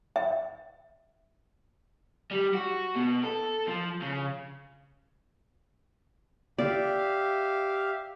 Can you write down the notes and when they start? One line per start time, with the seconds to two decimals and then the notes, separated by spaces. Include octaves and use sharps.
0.16 E5
2.31 G3
2.54 F#4
2.95 B2
3.23 A4
3.68 F3
4.02 C#3
6.58 G4 D5 E5 F5